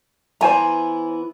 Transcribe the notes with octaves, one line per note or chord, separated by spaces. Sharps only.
E3 B3 E4 C5 G#5 A#5